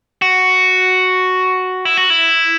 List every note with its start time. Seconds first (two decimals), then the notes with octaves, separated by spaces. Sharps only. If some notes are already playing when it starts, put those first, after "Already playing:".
0.22 F#4
1.85 E4
1.97 F#4
2.10 E4